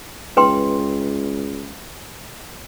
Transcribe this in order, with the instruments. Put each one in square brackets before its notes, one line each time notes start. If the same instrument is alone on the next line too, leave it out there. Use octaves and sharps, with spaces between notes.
[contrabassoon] C#2 [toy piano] B4 G5 C6